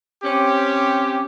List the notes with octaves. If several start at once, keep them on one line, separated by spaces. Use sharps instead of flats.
C4 C#4 G4